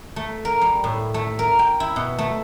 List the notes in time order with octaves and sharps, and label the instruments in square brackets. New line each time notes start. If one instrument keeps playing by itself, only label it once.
[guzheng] A3
A#4
G3
A2
A3
A#4
G5
E4
B2
A3